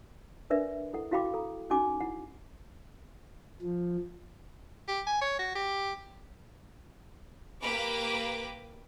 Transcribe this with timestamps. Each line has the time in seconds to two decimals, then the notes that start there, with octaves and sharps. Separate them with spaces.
0.50 D4 A#4 B4 D5 E5
0.93 E4 A4 F#5
1.11 E4 F#4 F5 G5 B5 D6
1.34 A4 A#5
1.70 C#4 D#4 F#4 G#5 D6
2.01 E4 F#5
3.62 F3
4.88 G4
5.07 G#5
5.21 C#5
5.39 F#4
5.55 G4
7.61 A#3 G4 B4 D6